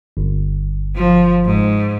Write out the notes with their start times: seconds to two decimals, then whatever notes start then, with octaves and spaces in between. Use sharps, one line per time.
0.17 G1
0.96 F3
1.46 G#2